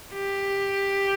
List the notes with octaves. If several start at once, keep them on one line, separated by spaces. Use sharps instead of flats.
G4